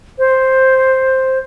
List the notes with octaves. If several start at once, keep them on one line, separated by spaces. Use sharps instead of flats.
C5